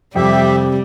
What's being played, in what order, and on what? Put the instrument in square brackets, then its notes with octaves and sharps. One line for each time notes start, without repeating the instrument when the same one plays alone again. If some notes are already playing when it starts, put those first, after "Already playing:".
[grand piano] F2 [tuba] C3 [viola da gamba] G3 [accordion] G4 E5